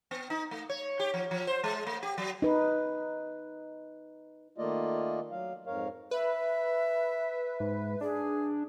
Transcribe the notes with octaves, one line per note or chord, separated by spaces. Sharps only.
B3
D#4
A3
C#5
G4
F3
F3
C5
G#3
A3
G4
F#3
D#4 B4
D#3 A3 A#3 F4 D5 D#5
F#3 F5
F2 G#2 A#4 C#5 F5
B4 E5
G#2
D4 G#4